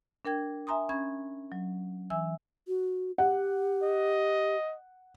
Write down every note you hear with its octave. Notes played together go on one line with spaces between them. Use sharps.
D4 A#4 G5 G#6
E5 G#5 A#5 C6 D#6
C#4 B5 G#6
F#3
E3 E5 G#5 E6
F#4
G4 F#5
D#5